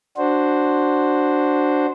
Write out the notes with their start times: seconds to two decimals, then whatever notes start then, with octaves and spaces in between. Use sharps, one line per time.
0.17 D4 F#4 C5